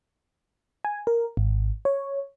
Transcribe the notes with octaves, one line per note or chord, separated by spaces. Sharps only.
G#5
A#4
G#1
C#5